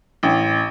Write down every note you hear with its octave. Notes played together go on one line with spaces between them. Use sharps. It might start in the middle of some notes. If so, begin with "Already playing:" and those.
A1